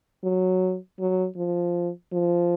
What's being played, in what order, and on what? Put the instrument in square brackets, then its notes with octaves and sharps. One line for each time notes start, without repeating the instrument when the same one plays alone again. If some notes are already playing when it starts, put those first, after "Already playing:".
[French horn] F#3
F#3
F3
F3